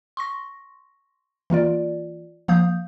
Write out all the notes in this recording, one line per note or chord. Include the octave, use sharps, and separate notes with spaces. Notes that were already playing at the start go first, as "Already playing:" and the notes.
C6 C#6 A#6
E3 A#3 F4 D5
F3 A#3 F5 D#6 G6